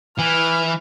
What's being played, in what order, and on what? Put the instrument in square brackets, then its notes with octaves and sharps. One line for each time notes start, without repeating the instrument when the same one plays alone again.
[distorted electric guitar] E3 [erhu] F6